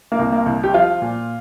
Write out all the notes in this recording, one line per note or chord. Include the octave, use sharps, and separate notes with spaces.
A#3
C2
A#3
C2
G4
F3 F4
A#2